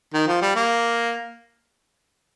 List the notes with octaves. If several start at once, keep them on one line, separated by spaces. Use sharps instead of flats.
D#3
F3
G3
A#3